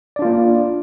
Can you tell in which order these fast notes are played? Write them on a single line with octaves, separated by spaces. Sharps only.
D5 D4 F4 A#3